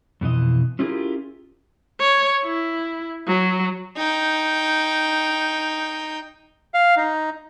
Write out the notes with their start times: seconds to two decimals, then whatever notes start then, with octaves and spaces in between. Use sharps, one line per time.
0.21 F2 B2 E3 D#5
0.79 C#4 E4 F4 G4 G#4 A#4
2.00 C#5
2.44 E4
3.27 F#3
3.97 D#4 G5
6.74 F5
6.97 D#4